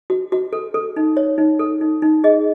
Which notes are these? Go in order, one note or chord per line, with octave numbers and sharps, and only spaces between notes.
F#4
F#4
A4
A4
D#4
C#5
D#4
A4
D#4
D#4
G#4 D#5